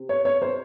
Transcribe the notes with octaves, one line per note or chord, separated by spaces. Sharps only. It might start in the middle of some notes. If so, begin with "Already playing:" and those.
Already playing: C3 C4
C#5
C#5
C5